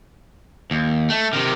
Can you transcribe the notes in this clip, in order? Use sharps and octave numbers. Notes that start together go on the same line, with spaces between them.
D#2
A3
C3 D#3